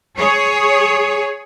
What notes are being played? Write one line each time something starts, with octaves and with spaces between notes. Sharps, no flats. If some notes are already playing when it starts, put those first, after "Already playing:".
G#4 C#5